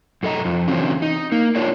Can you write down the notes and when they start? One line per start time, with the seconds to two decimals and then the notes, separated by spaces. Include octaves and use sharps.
0.23 F#2 A4 D#5 A#5
0.45 F2
0.68 C#3 E3 F#3 C4 D4
1.02 D#4
1.32 A#3
1.55 D4 D#4 F4 A#4 C#5 D5